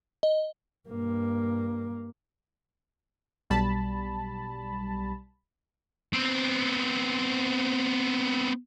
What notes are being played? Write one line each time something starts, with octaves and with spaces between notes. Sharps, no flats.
D#5
G2 A#3
B1 G3 A5 B5
B3 C4